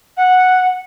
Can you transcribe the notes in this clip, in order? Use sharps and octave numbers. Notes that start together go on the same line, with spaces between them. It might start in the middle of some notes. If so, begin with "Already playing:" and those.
F#5